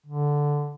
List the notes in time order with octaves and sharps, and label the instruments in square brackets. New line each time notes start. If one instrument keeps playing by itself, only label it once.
[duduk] D3